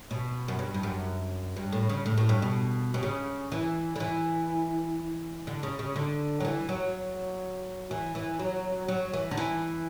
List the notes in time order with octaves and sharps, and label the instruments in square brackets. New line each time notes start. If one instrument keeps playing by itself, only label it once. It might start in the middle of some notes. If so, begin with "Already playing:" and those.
[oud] B2
F#2
G2
G2
F#2
G2
A2
C#3
A2
A2
G2
B2
B2
C#3
E3
D3
E3
D3
C#3
C#3
D3
F#3
E3
F#3
E3
E3
F#3
F#3
E3
D3
E3